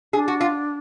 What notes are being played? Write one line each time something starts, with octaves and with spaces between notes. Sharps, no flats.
D4 G#4
F#4
F4